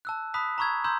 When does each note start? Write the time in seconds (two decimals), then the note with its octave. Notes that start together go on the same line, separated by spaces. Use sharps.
0.05 A5 E6 F#6
0.34 A5 B5 D#6 F#6 B6
0.58 A#5 B5 C#6 E6 G#6
0.84 A#5 C6 E6 G6 G#6